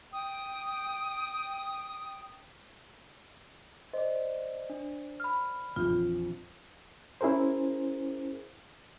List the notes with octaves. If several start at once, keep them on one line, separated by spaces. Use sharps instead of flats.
G5 D#6
C5 D5 D#5
D4
B5 F6
A#1 F2 E3 F4
C#4 E4 G#4 A#4 C5